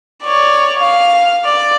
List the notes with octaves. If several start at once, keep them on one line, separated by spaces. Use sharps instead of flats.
C#5 D5
F5
D5